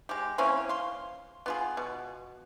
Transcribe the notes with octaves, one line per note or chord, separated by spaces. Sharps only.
G#3 G4
E3 A#3 C4 C#4
F5 C6
B3 F4 G#4
B2